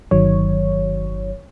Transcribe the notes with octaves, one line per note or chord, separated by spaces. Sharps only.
G1 D#3 F#3 C#5